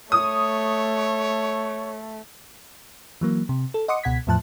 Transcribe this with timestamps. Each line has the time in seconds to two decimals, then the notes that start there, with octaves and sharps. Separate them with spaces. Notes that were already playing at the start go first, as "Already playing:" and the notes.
0.12 A3 C#5 D#6
3.21 E3 F#3 A#3
3.49 C3
3.74 A4
3.88 D#5 F#5 C6 D6 D#6 C#7
4.04 C#2 B2 F#5 G#6 B6
4.27 E2 A2 F3 A5 F#6